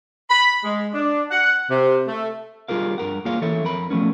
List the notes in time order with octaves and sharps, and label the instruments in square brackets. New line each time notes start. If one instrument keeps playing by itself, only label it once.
[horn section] B5
G#3
D4
F#5
C3
A3
[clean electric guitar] G3 F4 G#4 A#4 F5
G2 A#4 F#5
A#3 F4 G#4 C#5 F5
E3 A4 C#5 E5
F2 A#4 B5
F3 F#3 A3 B3 C#4